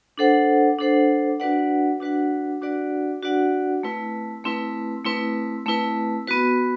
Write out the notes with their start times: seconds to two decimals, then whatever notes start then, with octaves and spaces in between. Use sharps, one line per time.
0.18 D4 A4 C5 F#5
0.78 D4 A4 C5 F#5
1.40 D4 F#4 B4 D5 F#5
2.00 D4 F#4 B4 D5 F#5
2.61 D4 F#4 B4 D5 F#5
3.23 D4 F#4 B4 D5 F#5
3.83 A3 C4 E4 B4
4.44 A3 C4 E4 B4
5.04 A3 C4 E4 B4
5.66 A3 C4 E4 B4
6.27 B3 F#4 B4